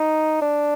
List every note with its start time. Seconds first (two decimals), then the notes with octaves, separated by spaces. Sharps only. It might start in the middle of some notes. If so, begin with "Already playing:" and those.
Already playing: D#4
0.42 D4